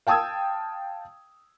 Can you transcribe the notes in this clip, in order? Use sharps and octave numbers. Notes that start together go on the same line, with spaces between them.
F5 G5 A5 D#6 E6 G#6